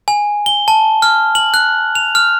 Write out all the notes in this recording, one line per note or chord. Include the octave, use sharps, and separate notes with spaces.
G#5
G7
A5
F6
F#7
F#6
F7
F6